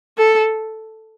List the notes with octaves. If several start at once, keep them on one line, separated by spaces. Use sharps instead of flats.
A4